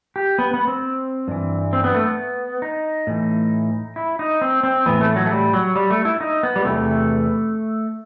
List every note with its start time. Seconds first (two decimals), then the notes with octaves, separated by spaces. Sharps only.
0.16 G4
0.39 B3
0.54 B3
0.68 C4
1.28 G2 E3
1.73 C4
1.84 B3
1.95 A3
2.06 B3
2.62 D#4
3.07 A2 E3
3.96 E4
4.19 D#4
4.41 C4
4.63 C4
4.86 A2 E3 B3
5.01 A3
5.16 F#3
5.26 A3
5.31 G3
5.53 F#3
5.75 G3
5.90 A3
6.05 E4
6.21 D#4
6.43 B3
6.56 G3
6.64 E2 C3 E3 A3